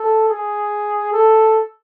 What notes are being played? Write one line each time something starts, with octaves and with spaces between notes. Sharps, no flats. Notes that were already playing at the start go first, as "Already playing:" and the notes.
Already playing: A4
G#4
A4